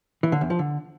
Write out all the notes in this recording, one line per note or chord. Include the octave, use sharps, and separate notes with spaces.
E3
D3
E2
F3
D3